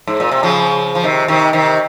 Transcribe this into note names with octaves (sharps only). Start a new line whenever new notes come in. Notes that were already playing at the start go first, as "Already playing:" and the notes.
G#2
A#2
C3
C#3 F3
F3
C3 D#3
C3 D#3
C3 D#3